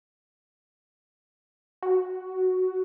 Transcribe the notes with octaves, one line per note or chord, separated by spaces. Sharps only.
F#4